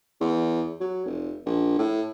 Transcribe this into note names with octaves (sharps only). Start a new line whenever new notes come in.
E2
F#3
F1
A#1
A2